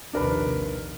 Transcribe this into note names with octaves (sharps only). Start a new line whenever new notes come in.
A#1 D#2 C3 D4 A#4 B4